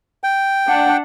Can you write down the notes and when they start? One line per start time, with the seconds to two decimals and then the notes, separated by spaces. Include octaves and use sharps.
0.24 G5
0.67 D4 F#5